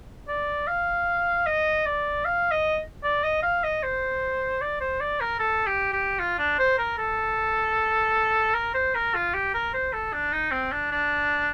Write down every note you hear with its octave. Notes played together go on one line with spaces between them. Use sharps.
D5
F5
D#5
D5
F5
D#5
D5
D#5
F5
D#5
C5
D5
C5
D5
A#4
A4
G4
G4
F4
D4
C5
A#4
A4
A#4
C5
A#4
F4
G4
A#4
C5
A4
D4
D#4
C4
D4
D4